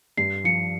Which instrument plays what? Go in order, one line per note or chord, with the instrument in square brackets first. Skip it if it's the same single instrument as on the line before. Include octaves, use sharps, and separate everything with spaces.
[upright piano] G2 [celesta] C7
[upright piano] F3 [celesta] C#7